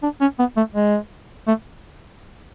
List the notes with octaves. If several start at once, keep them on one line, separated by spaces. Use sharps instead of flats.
D4
C#4
B3
A3
G#3
A3